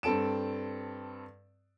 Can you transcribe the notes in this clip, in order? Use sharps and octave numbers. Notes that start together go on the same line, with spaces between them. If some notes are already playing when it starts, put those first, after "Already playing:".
G2 C4 A4 A5 D7 E7